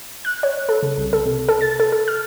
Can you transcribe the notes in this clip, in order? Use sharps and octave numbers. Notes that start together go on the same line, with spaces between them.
F#6
C#5
A4
C#3
C2
A4
C3
A4
A6
A4
A4
F6